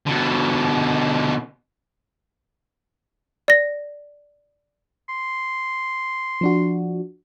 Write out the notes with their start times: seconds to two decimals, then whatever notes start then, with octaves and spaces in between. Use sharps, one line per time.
0.06 B2 D3
3.48 D5 A#6
5.09 C6
6.41 F3 D4 F#4